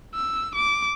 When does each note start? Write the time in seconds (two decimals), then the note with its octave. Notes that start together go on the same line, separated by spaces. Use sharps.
0.15 E6
0.55 D6